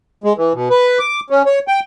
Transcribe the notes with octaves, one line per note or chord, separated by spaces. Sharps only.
G#3
E3
B2
B4
D6
C#4
C#5
G5